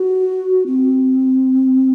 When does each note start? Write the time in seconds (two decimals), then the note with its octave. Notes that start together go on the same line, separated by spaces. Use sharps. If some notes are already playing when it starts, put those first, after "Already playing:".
Already playing: F#4
0.66 C4